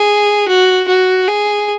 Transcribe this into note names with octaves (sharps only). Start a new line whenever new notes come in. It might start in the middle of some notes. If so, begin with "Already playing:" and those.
Already playing: G#4
F#4
F#4
G#4